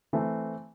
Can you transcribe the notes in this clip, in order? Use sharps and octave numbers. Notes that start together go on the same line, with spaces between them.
E3 A3 C4